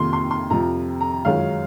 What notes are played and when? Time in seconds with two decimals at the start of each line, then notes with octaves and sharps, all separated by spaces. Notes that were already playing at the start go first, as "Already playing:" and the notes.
Already playing: F2 C3 D#3 A#3 F4 C6
0.13 C6
0.31 C6
0.50 F2 C3 F3 A#5
1.01 A#5
1.25 F#2 D#3 G#3 C#4 F4 F5